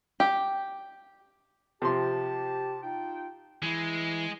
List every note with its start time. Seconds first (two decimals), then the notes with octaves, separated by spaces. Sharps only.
0.20 G4
1.82 C3 F3 G4 A5 C6
2.83 D#4 F4 G5
3.63 E3 G#3 E4